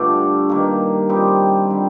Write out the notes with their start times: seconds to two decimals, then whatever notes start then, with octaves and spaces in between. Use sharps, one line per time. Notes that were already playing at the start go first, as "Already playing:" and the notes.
Already playing: G2 D3 A3 D4 F4
0.49 G2 D#3 A#3
1.09 G3 C4 D#4 G4
1.70 D3 G3